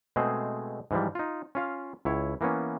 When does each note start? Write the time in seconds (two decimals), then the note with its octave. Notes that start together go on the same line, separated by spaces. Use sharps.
0.16 B2 G#3 A3 C4 G#4 C5
0.91 G#2 E3 F3 G3
1.15 D#4 F4
1.55 C#4 F4 F5
2.05 C#2 E4 C#5
2.41 E3 A#3 B3 C#4